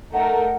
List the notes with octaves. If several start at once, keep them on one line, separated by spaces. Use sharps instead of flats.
A3 D#4 A#4 F#5